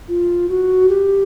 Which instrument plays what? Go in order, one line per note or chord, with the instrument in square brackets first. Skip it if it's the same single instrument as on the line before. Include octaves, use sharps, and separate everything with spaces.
[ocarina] F4
F#4
G4